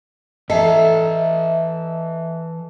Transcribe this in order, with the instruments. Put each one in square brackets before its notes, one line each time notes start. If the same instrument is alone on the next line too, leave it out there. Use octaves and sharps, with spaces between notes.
[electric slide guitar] E3 A#5 [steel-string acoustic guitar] A4 [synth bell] D#5 E5